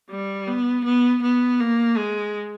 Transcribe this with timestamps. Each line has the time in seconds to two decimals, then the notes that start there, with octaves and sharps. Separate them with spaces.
0.10 G3
0.47 B3
0.85 B3
1.22 B3
1.60 A#3
1.97 G#3